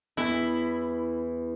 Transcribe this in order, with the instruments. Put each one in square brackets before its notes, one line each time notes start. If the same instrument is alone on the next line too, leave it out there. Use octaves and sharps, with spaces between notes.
[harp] E2 [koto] E4